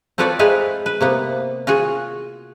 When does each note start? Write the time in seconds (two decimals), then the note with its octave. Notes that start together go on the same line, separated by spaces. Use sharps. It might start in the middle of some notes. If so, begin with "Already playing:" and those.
0.18 C4 F4 A4 B4 C#5 D5
0.39 G#3 D#4 E4 B4 F5
0.86 B4
1.01 C3 A#3 B3
1.67 F4 F#4 G#4